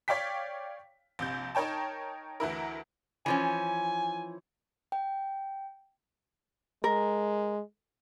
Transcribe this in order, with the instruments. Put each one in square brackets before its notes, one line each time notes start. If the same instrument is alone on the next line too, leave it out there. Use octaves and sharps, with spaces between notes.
[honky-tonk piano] C#5 D5 F5 G5 B6
A#1 C3 G6
D#4 A#4 C#5 G5 A5
D2 E3 E4 A#4
[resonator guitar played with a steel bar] E3 F3 C#4 [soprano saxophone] G#5
[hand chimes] G5
[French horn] G#3 [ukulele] A#4